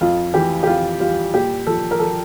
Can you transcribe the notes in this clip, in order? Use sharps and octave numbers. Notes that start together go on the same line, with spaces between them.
F2 F4
E3 G4
G4
F2 F4
G3 F4
A#2 G4
F3 A4
A#4
F3 A4